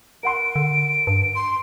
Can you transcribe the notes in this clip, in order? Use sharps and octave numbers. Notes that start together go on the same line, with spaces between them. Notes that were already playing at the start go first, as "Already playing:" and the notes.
A#4 F#5 C6 D7
D3
G2
C6